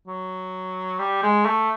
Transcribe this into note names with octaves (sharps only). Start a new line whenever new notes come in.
F#3
G3
G#3
A3